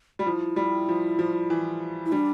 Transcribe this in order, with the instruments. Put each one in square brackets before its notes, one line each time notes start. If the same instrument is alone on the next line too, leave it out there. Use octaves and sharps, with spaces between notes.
[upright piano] G3
[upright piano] F3 [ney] E4
[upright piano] G3
F3
F3
E3
[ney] E4
[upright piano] G3 [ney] D4